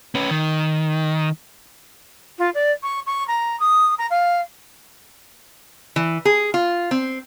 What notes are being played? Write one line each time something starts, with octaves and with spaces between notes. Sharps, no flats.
C#4 B4
D#3
F4
D5
C#6
C#6
A#5
D#6
A#5
F5
E3
G#4
F4
C4